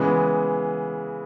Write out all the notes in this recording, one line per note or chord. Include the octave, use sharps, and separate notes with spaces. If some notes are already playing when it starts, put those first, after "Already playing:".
Already playing: C#3 E3 G#3 B3